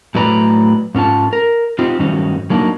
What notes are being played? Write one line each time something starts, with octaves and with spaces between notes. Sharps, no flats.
A2 F#3 A3 B4 D5 A#5
G#2 C#4 F4 A5
A#4
C4 D#4 F4 G4
G2 D#3 F#3 C#4 D#4
F#3 A#3 D4 D#4